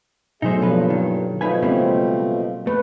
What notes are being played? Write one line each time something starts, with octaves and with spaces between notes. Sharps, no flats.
B2 F#3 A3 D#4 G#4 C5 E5
G2 A#2 C#3 F3 B4
D#3
B2 F3 A3 D#4 B4 G#5
C#3 G3 G#3 A#3 C4
A3 B4